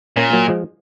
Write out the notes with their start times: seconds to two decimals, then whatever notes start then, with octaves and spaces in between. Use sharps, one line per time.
0.16 A#2 A#3 C#4
0.33 F#3 A#3
0.48 F3 G#3